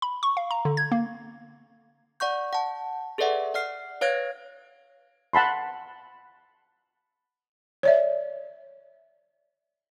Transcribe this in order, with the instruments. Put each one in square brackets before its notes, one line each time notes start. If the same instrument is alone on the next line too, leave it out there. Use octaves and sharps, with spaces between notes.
[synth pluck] B5
C#6
F5
A#5
D3
G#6
A#3
[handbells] D5 F#5 C#6 G6
F#5 A5
G#4 A4 B4 D5 E5 F#5
D5 F#5 F6 C7
B4 C#5 F5 F#6 G#6 A#6
[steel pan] F#5 A5 B5 C6
[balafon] C#5 D5 E5